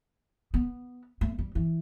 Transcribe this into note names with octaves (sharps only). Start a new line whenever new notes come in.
B3
A3
G3
E3